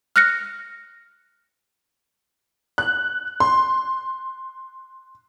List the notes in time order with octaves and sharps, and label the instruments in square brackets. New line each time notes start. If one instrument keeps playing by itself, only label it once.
[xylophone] F6 F#6 A#6 C#7
[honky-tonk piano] F#6
C6